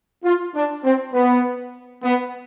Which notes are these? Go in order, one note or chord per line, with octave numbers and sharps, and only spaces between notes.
F4
D4
C4
B3
B3